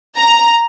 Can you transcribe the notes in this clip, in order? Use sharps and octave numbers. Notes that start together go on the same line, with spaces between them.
A#5